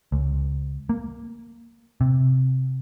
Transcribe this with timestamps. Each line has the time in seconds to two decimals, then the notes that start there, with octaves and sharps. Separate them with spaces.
0.12 C#2
0.89 A#3
2.01 C3